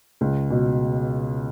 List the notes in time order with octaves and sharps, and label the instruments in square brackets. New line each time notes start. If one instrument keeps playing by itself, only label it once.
[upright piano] C#2
B2